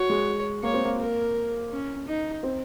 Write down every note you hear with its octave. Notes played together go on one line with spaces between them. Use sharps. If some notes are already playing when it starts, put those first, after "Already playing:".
Already playing: F#4 C#5
G#3
A#3 C#5
C4
A#3
A#4
C#4
D#4
C4